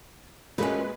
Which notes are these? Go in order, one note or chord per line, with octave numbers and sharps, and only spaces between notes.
A#2 G#3 A3 C#4 F#4 A#4 B4 D#5